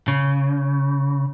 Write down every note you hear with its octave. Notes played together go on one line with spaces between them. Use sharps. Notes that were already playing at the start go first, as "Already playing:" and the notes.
C#3